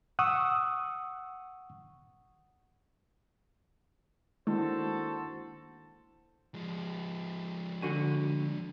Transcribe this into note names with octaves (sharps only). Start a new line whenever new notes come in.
F#5 C#6 D#6 E6
D#3 G#3 A#3 D4 E4 F#4 A4 C5
F3 G#3
D3 F#4 G#5